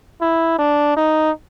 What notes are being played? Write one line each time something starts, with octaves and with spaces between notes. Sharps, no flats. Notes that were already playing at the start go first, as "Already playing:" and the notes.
E4
D4
D#4